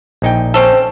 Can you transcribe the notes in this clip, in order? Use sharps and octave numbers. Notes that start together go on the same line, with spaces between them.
A#1 D#4 G5
C4 C#4 A4 C5